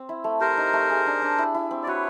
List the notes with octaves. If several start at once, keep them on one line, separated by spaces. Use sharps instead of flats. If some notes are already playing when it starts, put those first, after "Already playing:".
Already playing: C4
E4
A3
G4 A#4 C5
D#4
A3
G#4
D4
D4
E4
E4
C4
D5
F#4 B4 C#5